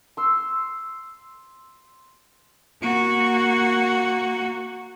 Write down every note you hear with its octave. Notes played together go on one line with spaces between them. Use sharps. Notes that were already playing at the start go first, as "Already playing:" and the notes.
C6 E6
A#3 F#4